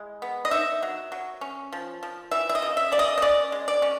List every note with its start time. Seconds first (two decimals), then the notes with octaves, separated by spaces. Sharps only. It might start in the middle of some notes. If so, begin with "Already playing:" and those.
Already playing: G#3 E4
0.22 B3
0.45 D#5
0.51 D#4 E5
0.82 F#3
1.12 F#3
1.41 C#4
1.72 F3
2.03 F3
2.31 E3 E5
2.49 E5
2.55 D#5
2.62 C#3
2.77 E5
2.92 C#3 D5
2.99 D#5
3.18 D#5
3.22 C#4 D5
3.52 G#3
3.68 D5
3.82 C#4